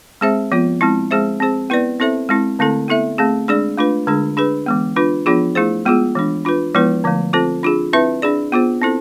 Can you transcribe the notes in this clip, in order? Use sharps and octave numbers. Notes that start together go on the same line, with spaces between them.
G#3 C4 G#4 C5 E5
F3 B3 F4
G#3 C4 E4
G#3 C4 G#4 C5 E5
C4 G#4 C5
B3 E4 B4 D5
C4 E4 A4 C5 E5
G#3 C4 E4
D3 A3 C4 E4 A4
B3 E4 A4 E5
A3 C4 G#4
G#3 D4 G#4 D5
A3 D4 F4 B4
D3 G#3 D4 G#4
D4 G#4 B4
E3 G#3 B3
D4 F4 B4
F3 B3 D4 F4 G#4
A3 E4 G#4 C5
G#3 B3 F4 G#4
E3 G#3 D4
D4 F4 B4
F3 G#3 B3 E4 B4
D3 F3 A3
C4 F4 A4 C5
D4 F4 G#4
C4 E4 B4 E5
D4 G#4 D5
B3 F4 G#4 C5
C4 E4 A4 C5